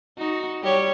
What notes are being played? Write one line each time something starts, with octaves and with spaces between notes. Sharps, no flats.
D#4 F#4
G3 G4 C#5